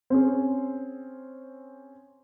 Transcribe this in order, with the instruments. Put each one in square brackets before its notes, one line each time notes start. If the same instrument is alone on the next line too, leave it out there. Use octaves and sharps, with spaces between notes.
[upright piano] C4 C#4 G#4